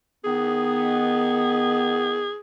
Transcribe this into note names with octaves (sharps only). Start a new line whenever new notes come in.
D#3 B3 G#4